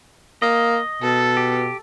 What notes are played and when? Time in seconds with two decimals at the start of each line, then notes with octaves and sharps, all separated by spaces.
0.42 A#3 D#5
1.02 B2 A4
1.37 G4